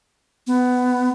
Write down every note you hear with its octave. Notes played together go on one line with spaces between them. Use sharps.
B3